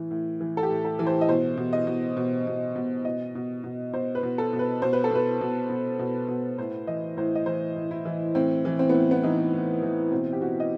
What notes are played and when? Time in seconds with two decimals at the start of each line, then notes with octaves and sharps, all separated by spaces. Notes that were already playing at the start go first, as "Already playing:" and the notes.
Already playing: A2 E3
0.11 A2
0.41 E3
0.57 A4
0.63 G4
0.70 A2
0.85 A4
0.99 E3
1.07 C5
1.21 D#5
1.28 B2 C5
1.57 B2
1.73 D#5
1.87 B2
2.17 B2
2.47 B2
2.76 B2
3.05 B2 D#5
3.35 B2
3.64 B2
3.93 B2 C5
4.15 B4
4.23 B2
4.38 A4
4.53 B2
4.59 B4
4.82 B2 C5
4.93 B4
5.04 A4
5.11 B2 B4
5.41 B2
5.69 B2
5.99 B2
6.28 B2
6.58 A2 C5
6.87 E3 D#5
7.17 A2 C5
7.35 D#5
7.46 E3 C5
7.76 A2
7.91 E4
8.05 E3
8.35 A2 C4
8.65 E3
8.79 C4
8.89 A2 B3
9.11 B3
9.23 E3 D#4
9.53 A2
9.82 E3
10.11 B2 C4
10.33 G4
10.40 B2 F#4
10.60 D#5